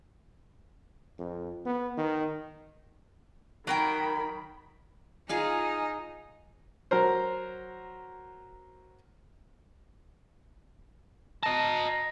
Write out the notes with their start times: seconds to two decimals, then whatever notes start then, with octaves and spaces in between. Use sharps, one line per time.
1.19 F2
1.66 B3
1.98 D#3
3.67 D#3 F#3 A#4 G5 B5
5.29 D#4 F4 G#4 F5 G#5
6.91 F#3 A#4 C5
11.43 D#5 A5 A#5